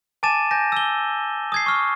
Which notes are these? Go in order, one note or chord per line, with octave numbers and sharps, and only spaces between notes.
G#5 A5 D6 A6 D#7 E7
G#5 G6 A#6
E6 G7
D#6 G#6 C7
C#6 F6